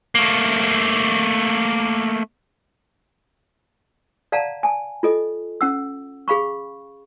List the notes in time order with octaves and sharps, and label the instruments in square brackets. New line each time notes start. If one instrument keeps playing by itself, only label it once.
[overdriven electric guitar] A3 A#3
[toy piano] D5 F5 F#5 A5 A#5
G#5 A5
F4 A4 D#5
C#4 F#5 E6
G#4 F5 B5 C#6